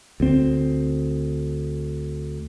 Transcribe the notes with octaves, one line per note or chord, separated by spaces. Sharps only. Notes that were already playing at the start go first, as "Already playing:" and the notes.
D2 C4